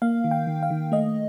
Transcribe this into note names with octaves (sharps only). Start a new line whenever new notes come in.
A#3 F5
D#3
G5
D#3
F5
D#3
A3 D#5